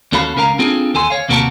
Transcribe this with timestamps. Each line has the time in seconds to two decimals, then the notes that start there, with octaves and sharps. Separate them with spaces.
0.12 D#2 C#4 F#4 A4 F5 B5
0.36 C#2 C#4 A#4 F5 A#5
0.59 C4 D4 F4 G#4 A4
0.94 D#2 A4 G#5 C6
1.10 C#5 F5
1.29 D#2 C3 A#3 F#4 A#4 A5